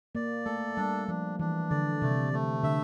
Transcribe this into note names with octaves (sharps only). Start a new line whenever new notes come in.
A#3 D5
A3 A4
G3 D4
F3 D4
E3 D4
D3 D5
C3 A3
A3
D3 E5